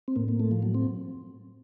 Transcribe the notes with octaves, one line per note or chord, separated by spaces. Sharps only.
C4
A2 A#3
A#3
A3
F3
F#3
C4